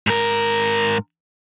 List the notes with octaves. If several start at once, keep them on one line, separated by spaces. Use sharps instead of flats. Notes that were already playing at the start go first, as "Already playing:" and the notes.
G#2 A#4